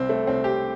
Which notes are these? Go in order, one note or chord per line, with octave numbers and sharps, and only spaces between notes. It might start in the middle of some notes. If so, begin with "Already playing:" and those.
Already playing: C2 C4
A3
C2 C4
G4